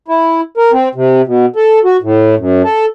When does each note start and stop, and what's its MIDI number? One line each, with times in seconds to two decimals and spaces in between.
0.08 0.41 64
0.57 0.71 70
0.72 0.89 60
0.95 1.22 48
1.27 1.46 47
1.56 1.79 69
1.84 1.97 66
2.02 2.35 45
2.38 2.62 42
2.64 2.86 69